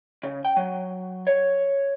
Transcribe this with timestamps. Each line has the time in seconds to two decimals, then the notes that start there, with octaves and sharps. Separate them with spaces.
0.23 C#3
0.45 G5
0.57 F#3
1.27 C#5